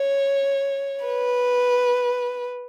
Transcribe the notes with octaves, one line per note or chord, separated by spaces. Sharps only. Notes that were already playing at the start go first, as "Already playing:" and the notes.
Already playing: C#5
B4